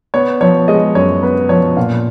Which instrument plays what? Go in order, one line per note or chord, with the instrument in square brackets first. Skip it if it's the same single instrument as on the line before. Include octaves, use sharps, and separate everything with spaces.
[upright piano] B3 C#5
F3 C#5
G#3 D#5
F#2 C#5
B3 B4
F3 C#5
A#2 F5